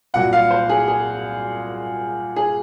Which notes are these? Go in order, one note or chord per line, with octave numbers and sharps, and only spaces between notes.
C2 A#2 F#3 F#5
F5
C5
G#4
G#4
G#4